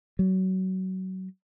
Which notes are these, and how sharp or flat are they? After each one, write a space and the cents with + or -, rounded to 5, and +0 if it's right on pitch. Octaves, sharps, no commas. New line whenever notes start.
F#3 +25